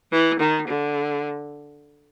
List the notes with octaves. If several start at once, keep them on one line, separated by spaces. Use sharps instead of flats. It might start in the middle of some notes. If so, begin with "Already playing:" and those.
E3
D#3
D3